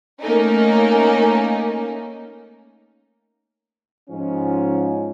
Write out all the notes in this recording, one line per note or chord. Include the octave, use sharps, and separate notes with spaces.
A3 A#3 C#4 D#4
G#2 F3 C#4